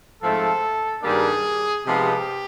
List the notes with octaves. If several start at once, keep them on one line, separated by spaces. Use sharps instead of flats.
G#2 F3 A3 C4 A4
G2 D#3 G3 A#3 D4 G#4
C3 F3 G#3 B3 D#4 G4